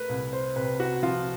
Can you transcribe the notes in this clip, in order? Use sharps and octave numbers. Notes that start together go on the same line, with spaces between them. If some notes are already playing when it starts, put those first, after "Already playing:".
Already playing: A3 A#4 B4
C2
C5
C3 B4
F#4
F3 F4